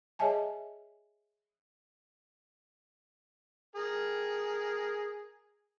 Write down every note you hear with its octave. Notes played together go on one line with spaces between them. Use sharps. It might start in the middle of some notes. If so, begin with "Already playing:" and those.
G#4 C#5 D#5 E5 G#5 A5
G#4 A#4